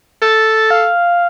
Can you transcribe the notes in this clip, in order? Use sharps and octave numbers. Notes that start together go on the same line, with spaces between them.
A4 A6
F5